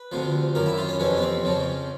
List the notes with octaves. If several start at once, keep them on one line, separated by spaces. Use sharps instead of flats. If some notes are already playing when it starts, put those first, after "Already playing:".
Already playing: B4
D2 C3 F3
F#2 D#3 A#4
E4
F4
C#4
F2 C3 E3 C#4
B3
C4
F2 C#3 F3